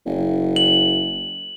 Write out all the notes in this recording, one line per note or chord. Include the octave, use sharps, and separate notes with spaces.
F#1
F#7